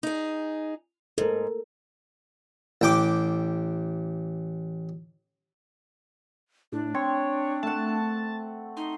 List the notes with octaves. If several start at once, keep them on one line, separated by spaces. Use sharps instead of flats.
D#4 G#4
G#2 A4 A#4
A1 G5 D6
A2 D4
C4 C#5
A3 F#5 A5
D#4 C6